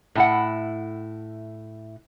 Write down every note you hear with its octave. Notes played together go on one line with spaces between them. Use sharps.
A2 E4 F#5